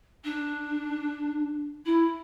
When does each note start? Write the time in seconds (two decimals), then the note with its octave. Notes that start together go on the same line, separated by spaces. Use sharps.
0.24 D4
1.85 E4